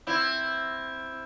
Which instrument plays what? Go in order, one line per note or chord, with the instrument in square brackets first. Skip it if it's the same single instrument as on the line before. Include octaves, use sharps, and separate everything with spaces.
[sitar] C4 E4